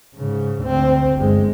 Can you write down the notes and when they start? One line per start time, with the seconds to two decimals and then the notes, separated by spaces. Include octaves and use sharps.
0.15 G#2 C#3
0.61 D2 C4
1.16 G1 G#3